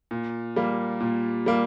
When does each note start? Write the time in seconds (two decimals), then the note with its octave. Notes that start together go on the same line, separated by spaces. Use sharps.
0.11 A#2
0.56 G3 A#3
1.00 A#2
1.46 G3 A#3